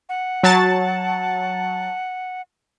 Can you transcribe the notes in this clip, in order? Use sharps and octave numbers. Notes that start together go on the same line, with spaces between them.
F#5
F#3 A5 A6